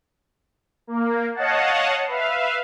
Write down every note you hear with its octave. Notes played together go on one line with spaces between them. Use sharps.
A#3
C#5 D#5 F5 F#5 A5
B4 E5 F5